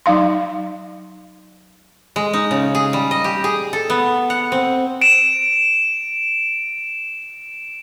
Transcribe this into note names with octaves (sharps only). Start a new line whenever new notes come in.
F#3 D#4 F5 C6
G#3
D#4
C#3
G#4
G3
D#5
G4
G#4
A4
B3
F#5
C4
D7 E7